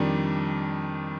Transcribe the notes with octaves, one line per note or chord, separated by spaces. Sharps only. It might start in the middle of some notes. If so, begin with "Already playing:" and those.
Already playing: F2 D#3 G3 D4